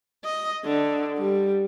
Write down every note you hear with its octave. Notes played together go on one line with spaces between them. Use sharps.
D#5
D3
G3